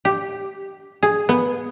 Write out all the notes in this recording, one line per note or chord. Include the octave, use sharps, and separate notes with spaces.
G4
G#4
B3